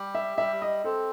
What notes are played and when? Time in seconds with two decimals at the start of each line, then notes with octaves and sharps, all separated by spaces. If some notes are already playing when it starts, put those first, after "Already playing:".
Already playing: G3 G4
0.15 E5
0.38 G3 E5
0.62 D#5
0.84 C4 A4